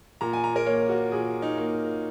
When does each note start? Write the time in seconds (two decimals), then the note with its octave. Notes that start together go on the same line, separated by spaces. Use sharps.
0.21 A#2 A#5
0.33 G#5
0.44 A#5
0.56 A#4
0.66 A#3 C#5
0.89 F#4
1.12 A#2 G#4
1.42 D#4
1.58 A#3